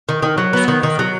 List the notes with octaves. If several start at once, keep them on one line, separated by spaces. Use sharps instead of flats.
D#3
D#3
F#3
B3
D#3
D#3
F#3